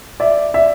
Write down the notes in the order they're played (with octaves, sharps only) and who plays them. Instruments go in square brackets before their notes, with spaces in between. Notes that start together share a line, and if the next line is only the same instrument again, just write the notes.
[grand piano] D5 E5
D5 E5